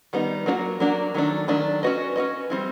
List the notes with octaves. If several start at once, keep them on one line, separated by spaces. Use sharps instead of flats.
D#3 G3 B3 D#4
F#3 A#3 D4 F#4 A#4
F#3 A#3 D4 F#4 A#4
D#3 F#3 A3 D4
D#3 F#3 A3 D4
C#4 F#4 B4 D#5
C#4 F#4 B4 D#5
G3 C4 E4